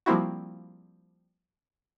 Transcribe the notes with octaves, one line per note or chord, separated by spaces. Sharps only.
F3 G3 A#3 C4 E4 F#4